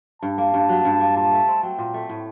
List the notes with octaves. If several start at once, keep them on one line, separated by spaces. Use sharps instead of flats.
G2 A5
A#3
G2
F#3
G2
A#3
A#2 A5
A3
C4
F#3 G5
A#2
A3
A2